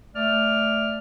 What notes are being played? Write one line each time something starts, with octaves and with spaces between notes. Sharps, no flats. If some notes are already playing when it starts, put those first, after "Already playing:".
A3 D5 F6